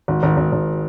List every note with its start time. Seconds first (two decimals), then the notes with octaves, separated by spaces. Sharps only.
0.08 G#1
0.23 G#1
0.37 G#1
0.52 G#1